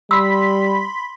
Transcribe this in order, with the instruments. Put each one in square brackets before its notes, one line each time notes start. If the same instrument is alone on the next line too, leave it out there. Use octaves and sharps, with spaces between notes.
[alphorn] G3 [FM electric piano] B5 C6 B6 [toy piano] E6